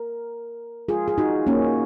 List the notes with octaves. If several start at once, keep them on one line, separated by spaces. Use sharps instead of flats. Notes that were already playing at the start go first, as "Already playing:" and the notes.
Already playing: A#4
F4 G#4
G#4
D#4 F#4
A#3 C#4